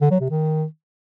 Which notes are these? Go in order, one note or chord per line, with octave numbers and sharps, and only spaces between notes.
D3
F#3
C3
D#3